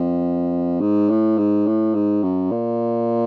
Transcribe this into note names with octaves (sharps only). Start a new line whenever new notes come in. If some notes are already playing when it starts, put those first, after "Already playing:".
Already playing: F2
G#2
A2
G#2
A2
G#2
F#2
A#2